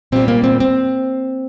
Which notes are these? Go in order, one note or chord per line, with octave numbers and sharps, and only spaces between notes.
A#2 G3 C4
A#3
C4
C4